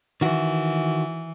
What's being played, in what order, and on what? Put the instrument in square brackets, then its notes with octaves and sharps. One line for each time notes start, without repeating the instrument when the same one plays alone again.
[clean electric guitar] D#3 F#4 [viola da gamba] E3